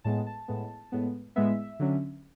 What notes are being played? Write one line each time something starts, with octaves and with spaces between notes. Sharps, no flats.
A2 G#3 B3 A5
A5
A2 G#3 B3
A2 G#3 B3
A2 G#3 B3 E5
D3 F#3 C#4